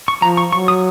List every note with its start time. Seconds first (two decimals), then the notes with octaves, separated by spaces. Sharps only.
0.08 C#6
0.22 F3 A#5
0.37 C#6
0.53 F#3 C#6
0.68 D#6